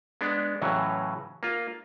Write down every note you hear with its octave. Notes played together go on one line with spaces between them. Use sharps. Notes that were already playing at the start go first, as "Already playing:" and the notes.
G#3 B3 D4
A2 C#3 E3 F#3
A#3 F4